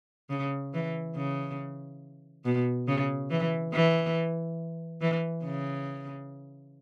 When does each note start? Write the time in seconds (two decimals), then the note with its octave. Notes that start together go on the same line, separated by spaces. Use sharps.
0.30 C#3
0.74 E3
1.16 C#3
2.45 B2
2.88 C#3
3.31 E3
3.73 E3
5.01 E3
5.45 C#3